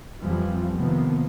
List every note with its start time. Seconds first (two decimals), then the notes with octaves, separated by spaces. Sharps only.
0.20 F2 E3 F3 G3
0.75 C3 D#3 F3 A#3 B3